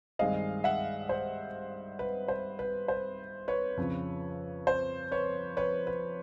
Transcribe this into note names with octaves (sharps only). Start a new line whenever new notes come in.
G2 D#3 G#3 C4 D#5 F5
E5 F#5
C5
B4
C5
B4
C5
B4 C#5
F2 C#3 F3
C5
B4 C#5
B4 C#5
B4